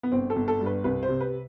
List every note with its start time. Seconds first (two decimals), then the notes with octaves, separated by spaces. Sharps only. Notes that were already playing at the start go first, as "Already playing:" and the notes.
0.03 B3
0.12 G1 C4
0.30 A4
0.36 G1
0.48 A4
0.60 G2
0.66 B4
0.84 C2 B4
1.03 C5
1.08 C3
1.21 B4